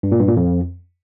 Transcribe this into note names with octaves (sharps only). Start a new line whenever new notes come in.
G2
A#2
G2
A#2
F2